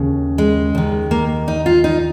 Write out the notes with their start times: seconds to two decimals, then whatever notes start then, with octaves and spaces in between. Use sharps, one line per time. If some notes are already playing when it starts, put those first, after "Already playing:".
Already playing: D#2 C#3
0.38 G#3
0.75 D#2 D#3
1.11 A#3
1.48 D#4
1.66 F4
1.84 D#4